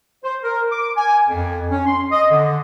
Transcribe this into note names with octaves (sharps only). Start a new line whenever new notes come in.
C5
A#4
D6
G#5
F2
C#4
C6
D#5
D3